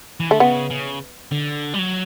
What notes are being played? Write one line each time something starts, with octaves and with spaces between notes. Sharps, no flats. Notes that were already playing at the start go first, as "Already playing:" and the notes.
E3
D3 A3
C#3 B3
C#3
D3
G3
F#3